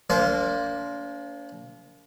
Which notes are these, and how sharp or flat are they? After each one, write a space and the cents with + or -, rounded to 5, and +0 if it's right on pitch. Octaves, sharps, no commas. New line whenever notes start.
A#3 -15 D4 -40 C5 +0